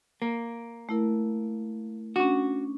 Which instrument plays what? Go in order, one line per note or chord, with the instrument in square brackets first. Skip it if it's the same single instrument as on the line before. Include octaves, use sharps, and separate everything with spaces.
[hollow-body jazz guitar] A#3
[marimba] A3 E4 A#4
[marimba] C#4 D4 [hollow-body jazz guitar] F#4